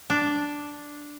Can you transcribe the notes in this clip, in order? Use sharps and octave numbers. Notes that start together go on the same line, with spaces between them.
D4